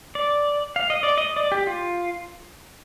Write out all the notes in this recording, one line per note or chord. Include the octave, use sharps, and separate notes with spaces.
D5
F5
D#5
D5
D#5
D5
G4
F4